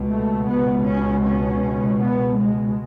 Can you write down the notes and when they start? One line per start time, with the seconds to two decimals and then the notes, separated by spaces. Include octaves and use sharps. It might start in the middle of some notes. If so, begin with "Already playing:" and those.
Already playing: C#2 B2
0.09 A3
0.47 B3
0.85 C#4
1.23 C#4
1.98 B3
2.37 G#3